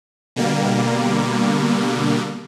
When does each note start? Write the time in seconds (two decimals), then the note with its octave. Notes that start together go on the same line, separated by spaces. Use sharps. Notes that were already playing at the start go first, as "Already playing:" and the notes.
0.36 B2 D3 G3 A#3